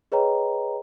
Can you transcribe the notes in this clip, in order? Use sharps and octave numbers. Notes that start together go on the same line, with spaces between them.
G#4 B4 C#5 D#5 G5 A#5